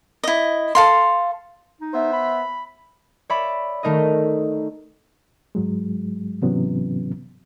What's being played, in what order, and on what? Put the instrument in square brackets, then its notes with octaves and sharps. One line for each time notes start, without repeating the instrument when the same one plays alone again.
[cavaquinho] E4 D#5
A4 F5 C6
[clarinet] D#4
[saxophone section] B3 C5 E5
[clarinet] B5
[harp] C#5 D5 E5 B5
D#3 A3 D#4 A#4 D#5
[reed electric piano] G#2 F#3 G#3
G#2 C3 E3 F#3 B3 C#4